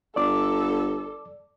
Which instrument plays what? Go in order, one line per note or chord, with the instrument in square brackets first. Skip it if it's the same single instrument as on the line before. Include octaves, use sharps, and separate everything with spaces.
[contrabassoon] G1 [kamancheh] A4 [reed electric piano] D5 D6